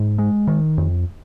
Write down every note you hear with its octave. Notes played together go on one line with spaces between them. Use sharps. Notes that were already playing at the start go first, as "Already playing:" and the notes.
Already playing: G#2
G#3
D#3
F2